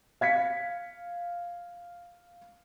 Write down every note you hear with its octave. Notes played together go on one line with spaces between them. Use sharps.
F5 G#6 B6 C#7